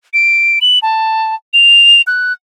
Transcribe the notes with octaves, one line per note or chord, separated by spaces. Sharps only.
D7
F#7
A5
F7
F#6